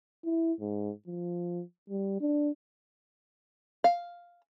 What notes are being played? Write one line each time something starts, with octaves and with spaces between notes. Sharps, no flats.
E4
G#2
F3
G3
D4
F5